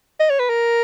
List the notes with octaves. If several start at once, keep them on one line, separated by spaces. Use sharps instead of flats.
D#5
C#5
B4
A#4